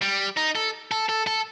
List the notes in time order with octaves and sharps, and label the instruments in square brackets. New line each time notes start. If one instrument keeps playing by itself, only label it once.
[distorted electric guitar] G3
D#4
A4
A4
A4
A4